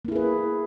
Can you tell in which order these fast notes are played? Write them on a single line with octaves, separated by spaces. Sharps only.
A#3 E4 G#4 B4